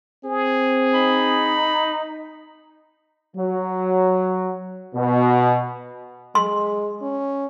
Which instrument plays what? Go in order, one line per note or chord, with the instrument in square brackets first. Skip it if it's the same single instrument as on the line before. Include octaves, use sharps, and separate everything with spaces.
[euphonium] C4 [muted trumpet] G#4
[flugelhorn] D#4 [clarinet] B5
[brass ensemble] F#3
B2
[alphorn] G#3 [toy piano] C6
[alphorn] C#4